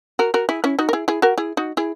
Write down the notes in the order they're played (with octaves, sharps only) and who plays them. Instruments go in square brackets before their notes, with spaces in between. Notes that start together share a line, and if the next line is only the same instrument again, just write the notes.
[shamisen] F#4 A#4
F#4 A#4
E4 G#4
C#4 E4
D#4 F#4
A#4
E4 G#4
E4 G#4
F#4 A#4
E4 G#4
D#4 F#4
E4 G#4